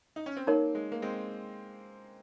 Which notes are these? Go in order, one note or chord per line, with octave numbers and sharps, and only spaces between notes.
D#4
C#4
C4
A#3 D#4 A#4 C#5
G#3
A#3
G#3 C4